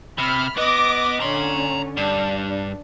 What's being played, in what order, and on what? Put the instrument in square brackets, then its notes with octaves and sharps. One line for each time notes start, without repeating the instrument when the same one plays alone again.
[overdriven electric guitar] C3 [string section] B5 F6
[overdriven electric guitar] B3 B4 [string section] D#5 D6 A#6
[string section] D3 C#4 [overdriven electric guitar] A#5 C6
[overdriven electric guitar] G2 [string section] D4